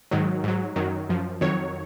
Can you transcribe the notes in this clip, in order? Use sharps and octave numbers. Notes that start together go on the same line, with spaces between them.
G#2 D#3 F#3
G#2 F#3
F#2 D#3 F#3
F#2 F3
F2 D#3 F#3 C#5